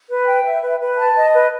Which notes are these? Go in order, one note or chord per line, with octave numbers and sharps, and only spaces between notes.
B4
G5
E5
B4
B4
A5
D#5
B4